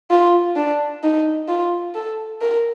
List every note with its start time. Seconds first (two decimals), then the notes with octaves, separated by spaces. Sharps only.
0.11 F4
0.57 D4
1.03 D#4
1.48 F4
1.95 A4
2.41 A#4